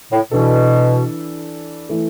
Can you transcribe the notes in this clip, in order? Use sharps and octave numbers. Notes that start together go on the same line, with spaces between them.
A2
B2 E3 D4 A4
E3 A3 E4 A4